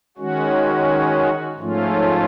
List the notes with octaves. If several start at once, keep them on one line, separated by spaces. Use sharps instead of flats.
D#3 G#3 C#4 F#4
G#2 F3 A3 C#4 F4